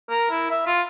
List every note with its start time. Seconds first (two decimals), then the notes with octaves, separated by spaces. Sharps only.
0.10 A#4
0.31 E4
0.51 E5
0.67 F4